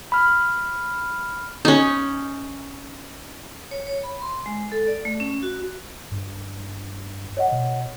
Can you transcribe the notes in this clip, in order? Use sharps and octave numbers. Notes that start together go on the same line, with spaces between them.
B5 F6
C#4 D#4
C#5
C#5
B5
C6
G#3
A4
D5
A3
C#4
F#4
G2
C#5 D#5 F#5
B2